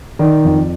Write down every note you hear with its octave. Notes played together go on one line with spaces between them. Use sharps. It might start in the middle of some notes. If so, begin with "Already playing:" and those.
D#3 D5
F2